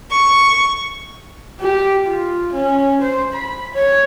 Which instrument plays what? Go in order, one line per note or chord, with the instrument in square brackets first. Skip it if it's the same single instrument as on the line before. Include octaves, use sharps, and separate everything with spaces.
[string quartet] C#6
[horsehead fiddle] G4
F4
C#4
C5
B5
C#5